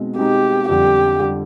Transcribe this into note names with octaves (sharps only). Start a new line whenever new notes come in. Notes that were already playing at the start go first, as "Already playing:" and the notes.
Already playing: B2 G#3 C4 D#4
B2 G#3 C4 D#4 G4
F2 D3 G3 G4
D3 G3